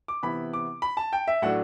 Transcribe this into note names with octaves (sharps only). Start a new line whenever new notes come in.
D6
C3 E3 B3 E4 B5
D6
B5
A5
G5
E5
A2 F#3 A3 D4 F#5